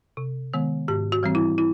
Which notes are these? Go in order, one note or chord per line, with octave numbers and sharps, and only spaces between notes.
C3
D#3 G#3 B3
G#2 G4
F#4
E3 G3 C4
E4
E4